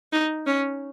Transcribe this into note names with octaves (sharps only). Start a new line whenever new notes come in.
D#4
C#4